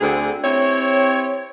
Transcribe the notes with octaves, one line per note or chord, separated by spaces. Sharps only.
D2 D3 C4 G#4
C4 E4 G4 C#5